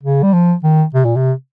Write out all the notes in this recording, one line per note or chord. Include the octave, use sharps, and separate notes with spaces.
C#3
G3
F3
D#3
C3
A#2
C3